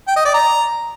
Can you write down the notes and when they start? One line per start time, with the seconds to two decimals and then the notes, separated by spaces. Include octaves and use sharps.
0.07 G5
0.16 D#5
0.25 D5
0.34 A#5